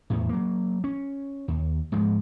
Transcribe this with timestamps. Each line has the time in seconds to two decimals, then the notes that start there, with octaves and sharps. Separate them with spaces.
0.10 E2 A2
0.29 F#3 A#3
0.84 C#4
1.48 D#2
1.92 G#2 F3 G#3